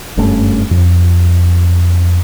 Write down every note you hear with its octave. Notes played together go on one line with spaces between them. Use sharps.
F#1 G2 A3 C#4
F2